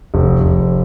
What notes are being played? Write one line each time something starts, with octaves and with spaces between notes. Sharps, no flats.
F1
F1